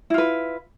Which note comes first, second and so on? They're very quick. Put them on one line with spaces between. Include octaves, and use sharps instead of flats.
E4 F4 B4